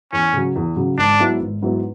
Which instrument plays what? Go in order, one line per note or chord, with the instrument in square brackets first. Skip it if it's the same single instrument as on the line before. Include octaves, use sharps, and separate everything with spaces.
[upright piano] E2 [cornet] C#4
[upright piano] C#3 F#3
E2
C#3 F#3
[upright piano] G#1 [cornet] D4
[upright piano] G#2 F#3 B3 E4
G#1
G#2 F#3 B3 E4